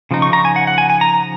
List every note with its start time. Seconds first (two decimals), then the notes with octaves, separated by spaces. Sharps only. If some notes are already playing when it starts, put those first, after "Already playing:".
0.11 C#3 F3 D#4
0.22 C#6
0.33 A#5
0.45 G#5
0.56 F#5
0.67 F#5
0.78 G#5
0.90 G#5
1.01 A#5